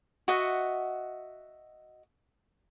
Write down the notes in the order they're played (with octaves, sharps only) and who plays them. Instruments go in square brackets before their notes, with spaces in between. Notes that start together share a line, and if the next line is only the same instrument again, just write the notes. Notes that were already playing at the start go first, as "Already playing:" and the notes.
[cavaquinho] F#4 D#5 E5 F#5